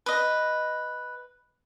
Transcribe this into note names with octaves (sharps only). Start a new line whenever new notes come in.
B4 D#5